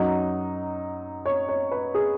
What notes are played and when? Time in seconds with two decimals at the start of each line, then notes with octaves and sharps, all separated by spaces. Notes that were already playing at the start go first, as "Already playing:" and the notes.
Already playing: F#2 F#3 D#4
1.26 C#5
1.49 C#5
1.71 B4
1.95 G#4